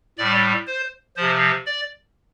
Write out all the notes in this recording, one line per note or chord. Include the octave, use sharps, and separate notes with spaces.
A2 G3 D5
C5
C3 F3 C5
D5